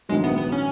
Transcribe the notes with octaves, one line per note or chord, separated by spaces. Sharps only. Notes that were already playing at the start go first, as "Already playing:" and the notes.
A#1 G#2 D#3 F#3 G#3
B3
B3
C#4